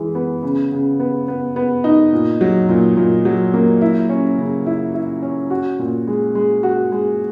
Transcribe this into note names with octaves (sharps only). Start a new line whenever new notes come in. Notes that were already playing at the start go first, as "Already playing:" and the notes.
Already playing: E3 G#3
B3
C#3
C#3
B3
B3
B3
D#4
A#2
F#3
A#2
A#2
F#3
A#3
E4
C#4
C#3
E4
E4
C#4
F#4
A#2
G#3
G#3
F#4
G#3